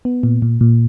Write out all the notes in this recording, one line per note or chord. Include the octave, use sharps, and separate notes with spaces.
B3
A#2
A#2
A#2